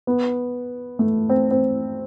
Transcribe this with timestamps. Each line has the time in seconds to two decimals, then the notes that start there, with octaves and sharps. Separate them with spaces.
0.07 B3
0.99 A3
1.29 C4
1.51 C4